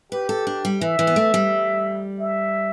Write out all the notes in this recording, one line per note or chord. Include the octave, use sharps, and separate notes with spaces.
G4 B4
A4
D4
G3
E3 E5
E3
B3
A3
G3
E5